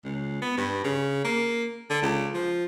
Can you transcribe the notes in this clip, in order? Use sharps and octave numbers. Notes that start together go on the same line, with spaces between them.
C#2
B3
G2
C#3
A#3
D3
C#2
F3